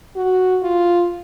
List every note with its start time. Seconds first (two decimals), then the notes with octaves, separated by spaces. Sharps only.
0.16 F#4
0.62 F4